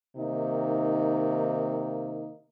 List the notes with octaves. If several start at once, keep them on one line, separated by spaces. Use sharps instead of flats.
C3 D#3 A#3 D#4